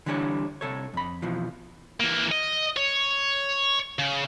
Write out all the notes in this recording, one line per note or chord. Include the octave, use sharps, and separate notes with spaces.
D3 E3 G3 D4 G4 C#5
C2 A4 C#5
F2 B5
F2 B2 E3 F3
E3 A#3
D#5
C#5
C#3